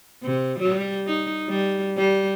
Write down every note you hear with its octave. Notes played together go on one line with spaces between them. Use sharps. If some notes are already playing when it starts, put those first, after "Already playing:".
C3
G3
D#4
G3
G3